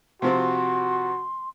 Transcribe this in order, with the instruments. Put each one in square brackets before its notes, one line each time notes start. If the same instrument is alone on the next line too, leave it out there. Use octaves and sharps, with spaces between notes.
[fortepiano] C3 F3 C4 [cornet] F#4 [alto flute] C6